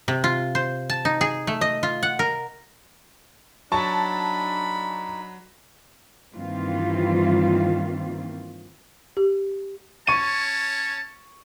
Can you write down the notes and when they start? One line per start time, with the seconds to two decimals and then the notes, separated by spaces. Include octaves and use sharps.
0.08 C3
0.24 F4
0.55 C5
0.90 A5
1.05 D#4
1.21 G#4
1.47 A3
1.61 D#5
1.83 F4
2.03 F#5
2.19 A#4
3.72 F#3 D4 D#4 A5 B5 C#6
6.35 G2 D#3 E3 A#3 C4 F4
9.17 G4
10.07 C#4 C#5 A5 C#6 D#7